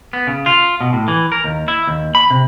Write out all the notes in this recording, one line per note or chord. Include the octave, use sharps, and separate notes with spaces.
B3
C#3
F4
B2
A2
E3
A#4
D#2
E4
D#2
B5
C3